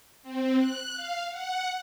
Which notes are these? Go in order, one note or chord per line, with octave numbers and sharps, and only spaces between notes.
C4
F#6
F5
F#5